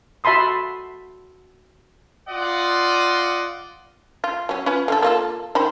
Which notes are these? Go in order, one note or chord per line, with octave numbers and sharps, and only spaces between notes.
F#4 E5 A5 B5 C6 D#6
F4 D5 D#5 F#5
F4
F#3 C#4
C#4 F4 B4
D3 F4 A4
A#3 F4 A4
D#3 C5 B5